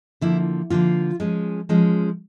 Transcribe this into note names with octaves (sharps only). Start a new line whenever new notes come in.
D3 F3 A#3 E4
D3 F3 A#3 F4
F3 G#3 C#4
F3 G#3 C#4